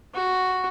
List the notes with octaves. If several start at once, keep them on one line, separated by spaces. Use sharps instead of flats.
F#4